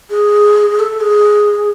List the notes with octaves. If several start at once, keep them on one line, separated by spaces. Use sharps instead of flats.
G#4
A4
A4
G#4